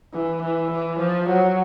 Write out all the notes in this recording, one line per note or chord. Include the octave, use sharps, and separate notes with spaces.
E3
E3
E3
F3
F#3